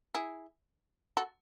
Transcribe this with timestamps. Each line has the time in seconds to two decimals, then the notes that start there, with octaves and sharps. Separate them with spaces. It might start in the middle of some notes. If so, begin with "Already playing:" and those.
0.15 E4 G#4
1.17 F#4 A4